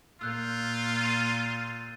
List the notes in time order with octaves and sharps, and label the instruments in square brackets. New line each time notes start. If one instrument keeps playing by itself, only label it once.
[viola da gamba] A#2 [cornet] F4 [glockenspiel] E6 F#6 G6
[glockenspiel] C6 A6 D#7